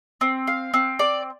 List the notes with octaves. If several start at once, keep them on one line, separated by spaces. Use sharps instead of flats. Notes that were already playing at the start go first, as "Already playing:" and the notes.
C4
F5
C4
D5